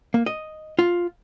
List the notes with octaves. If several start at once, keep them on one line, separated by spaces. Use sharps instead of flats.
A#3
D#5
F4